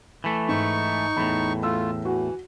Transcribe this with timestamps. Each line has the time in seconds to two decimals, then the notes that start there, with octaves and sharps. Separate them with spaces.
0.24 E3 A3
0.49 G#2 D#4 C#6
1.17 E2 A2 B5
1.63 A3 F4 E6
2.05 E3 F#4